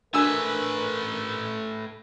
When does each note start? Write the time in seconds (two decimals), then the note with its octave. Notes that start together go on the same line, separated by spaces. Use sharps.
0.14 A3 D4 F#4 A#4 B4 G#5 E6